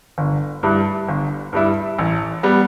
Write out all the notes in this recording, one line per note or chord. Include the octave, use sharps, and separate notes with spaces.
G1
G2 G3 E4
G1
G2 G3 E4
A1
G3 B3